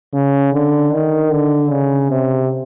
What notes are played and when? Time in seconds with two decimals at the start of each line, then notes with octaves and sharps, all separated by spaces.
0.13 C#3
0.53 D3
0.92 D#3
1.31 D3
1.70 C#3
2.09 C3